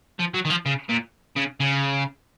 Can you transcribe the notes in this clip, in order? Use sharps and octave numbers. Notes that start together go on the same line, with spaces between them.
F3
F#3
D#3
F3
C#3
A#2
C#3
C#3